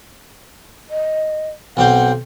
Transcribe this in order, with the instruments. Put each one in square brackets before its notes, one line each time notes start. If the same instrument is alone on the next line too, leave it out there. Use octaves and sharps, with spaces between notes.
[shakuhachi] D#5
[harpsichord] B1 C4 C5 [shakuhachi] F#5